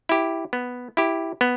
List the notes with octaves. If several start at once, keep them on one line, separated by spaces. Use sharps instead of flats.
E4 G4
B3
E4 G4
B3